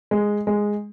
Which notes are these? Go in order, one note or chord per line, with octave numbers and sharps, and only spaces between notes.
G#3
G#3